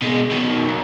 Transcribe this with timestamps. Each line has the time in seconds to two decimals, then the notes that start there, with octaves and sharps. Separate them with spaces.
0.02 B2 G#3
0.31 B2 D#3
0.68 B1